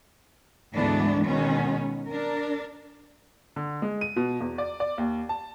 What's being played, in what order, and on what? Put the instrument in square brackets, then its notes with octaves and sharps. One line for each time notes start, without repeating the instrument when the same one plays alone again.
[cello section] D2 G#2 E3 A3 B3 D4
B2 D#3 G#3 C#4
D4 A#4
[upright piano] D3
G#3
D#7
B2
E2
D5
D5
D#2
A5